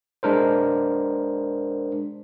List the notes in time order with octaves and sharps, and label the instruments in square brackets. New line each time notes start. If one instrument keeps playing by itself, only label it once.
[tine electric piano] G#3 D4 A#4 C5